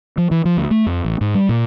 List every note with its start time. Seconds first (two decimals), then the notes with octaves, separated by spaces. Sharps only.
0.18 F3
0.31 E3
0.45 F3
0.57 D2
0.71 A3
0.86 F2
1.05 A1
1.21 G#2
1.35 G3
1.49 A#2